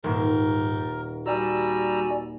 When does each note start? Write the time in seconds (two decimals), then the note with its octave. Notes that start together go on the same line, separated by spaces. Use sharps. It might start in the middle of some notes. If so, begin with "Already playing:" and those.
0.04 D#1 G#2 A#4
1.26 G3 F#4 D5 G#5 A#5 E6